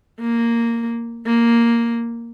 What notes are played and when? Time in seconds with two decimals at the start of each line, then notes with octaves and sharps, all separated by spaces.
0.20 A#3
1.26 A#3